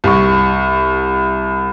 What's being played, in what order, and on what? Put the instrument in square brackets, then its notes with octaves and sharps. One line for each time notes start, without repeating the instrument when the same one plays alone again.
[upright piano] C2 C#6